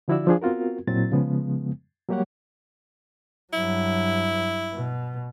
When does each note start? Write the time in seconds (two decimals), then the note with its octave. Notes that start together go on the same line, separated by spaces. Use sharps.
0.08 D3 F3 E4 F#4 D5 E6
0.27 F3 D4 G#4
0.42 B3 C4 F4 F#4 A#4
0.87 A#2 F#3 C4 E4 A6
1.12 C#3 F3 G#3 B3
2.09 F#3 G3 A#3 G4 C#5 F#5
3.53 G2 F#3 E4
4.74 B2